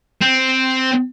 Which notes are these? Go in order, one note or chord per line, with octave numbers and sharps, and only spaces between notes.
C4